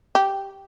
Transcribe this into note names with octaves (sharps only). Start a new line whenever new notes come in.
G4